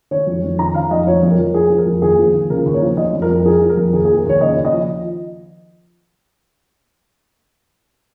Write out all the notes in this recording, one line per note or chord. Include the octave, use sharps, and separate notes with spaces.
D#3 C#5
F2
F2
D#3 A#5
D#3 F5
F2 D#5
F3 C#5
F2
A#4
F2
F3 G#4
F3
A#4
F2
D#2 G#4
F3
D#2
C#3 A#4
D#2
C#5
F3
F3 D#5
F2
A#4
F2
F3 G#4
F3
A#4
F2
D#2 G#4
G#4
F3
A#4
D#2 C#5
C#3 D#5
D#2
D#5
F3